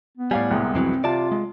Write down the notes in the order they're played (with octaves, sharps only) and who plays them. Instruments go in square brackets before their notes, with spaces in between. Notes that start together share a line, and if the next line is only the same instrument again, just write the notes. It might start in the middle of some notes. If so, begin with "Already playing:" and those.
[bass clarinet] B3
[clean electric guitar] A2 G3 [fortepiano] D5 F5 G#5
[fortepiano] C2 C3 G#3
[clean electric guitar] F2 E3 F#3 [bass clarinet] C4
[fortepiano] C3 [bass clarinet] F4 [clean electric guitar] D5 A5
[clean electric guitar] G#3